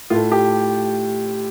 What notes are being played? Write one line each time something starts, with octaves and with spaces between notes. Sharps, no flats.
A2 A3 F4
G4